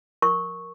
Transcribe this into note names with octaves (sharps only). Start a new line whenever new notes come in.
A#4 C#6